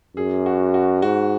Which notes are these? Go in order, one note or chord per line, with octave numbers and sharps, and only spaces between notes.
F#2 G#4
F#4
F#4
G#2 F#4